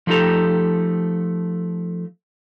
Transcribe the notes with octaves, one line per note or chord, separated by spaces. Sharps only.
F3 A3 D#4 G4 A4 A#5